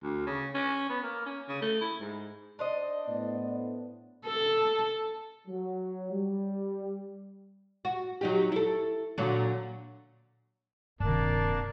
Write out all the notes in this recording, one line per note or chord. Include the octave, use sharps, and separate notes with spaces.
D2
C#3
C#4
B3
A#3
C#4
C#3
A3
E4
G#2
D4 C5 D5 D#5
A2 B3
A4
F#3
G3
F#4
F#3 D#4 G4
E4 A4
A#2 D3 F#3
D#1 G2 C3 D#3 A#3 D4 D5 A5